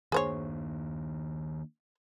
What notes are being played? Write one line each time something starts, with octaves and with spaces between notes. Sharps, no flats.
D#3 A#3 D4 G#4 C5 C#5